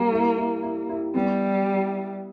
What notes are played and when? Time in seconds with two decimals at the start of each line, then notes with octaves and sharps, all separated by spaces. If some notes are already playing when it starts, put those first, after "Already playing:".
Already playing: G3 A#3
0.12 E4
0.37 E4
0.62 E4
0.89 E4
1.14 G3 B3